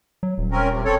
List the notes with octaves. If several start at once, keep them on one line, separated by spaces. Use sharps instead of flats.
F#3
D#1
C4 C#4 A#4
C3
C4 A4 C#5